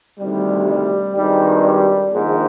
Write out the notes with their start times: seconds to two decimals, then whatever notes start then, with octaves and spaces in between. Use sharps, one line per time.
0.19 D2 C3 D#3 G3
0.68 G3
1.16 G#1 G2 D#3 G3
1.64 G3
2.11 A#1 G#2 D#3